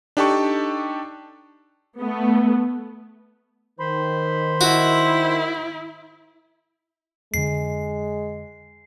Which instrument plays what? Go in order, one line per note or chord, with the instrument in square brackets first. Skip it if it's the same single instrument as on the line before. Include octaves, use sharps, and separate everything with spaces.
[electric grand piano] D4 D#4 G4 A4 A5 C#6
[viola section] A3 B3
[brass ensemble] D#3 [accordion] C5 B5 C6
[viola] E4 [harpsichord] F#4
[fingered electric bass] F2 D3 [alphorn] G#3 [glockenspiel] C7